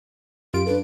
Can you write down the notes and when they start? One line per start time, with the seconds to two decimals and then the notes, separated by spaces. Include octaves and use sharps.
0.54 F#2 F4 G4 D7
0.67 D4 A4 B4